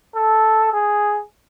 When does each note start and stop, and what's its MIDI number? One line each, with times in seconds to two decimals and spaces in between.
0.15 0.72 69
0.73 1.21 68